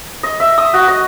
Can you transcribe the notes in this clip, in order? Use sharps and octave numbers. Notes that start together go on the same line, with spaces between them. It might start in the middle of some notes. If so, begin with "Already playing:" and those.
D#5
E5
D#6
F#4
D#5